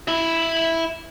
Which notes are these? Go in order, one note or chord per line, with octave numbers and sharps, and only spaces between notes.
E4 E5